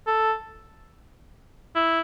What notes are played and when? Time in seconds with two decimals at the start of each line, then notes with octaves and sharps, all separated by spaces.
0.07 A4
1.75 E4